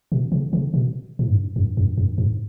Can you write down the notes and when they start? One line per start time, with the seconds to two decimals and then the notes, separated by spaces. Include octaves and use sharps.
0.12 B2
0.32 C#3
0.53 C#3
0.74 B2
1.19 A2
1.29 G2
1.56 F#2
1.77 F#2
1.98 F#2
2.18 G2